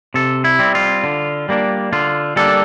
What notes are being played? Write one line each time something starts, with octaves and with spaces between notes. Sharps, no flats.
C3 A4
E4
G3 C4
F4
D3
G3 A#3 D4
D3 F4
G3 A#3 D4 A4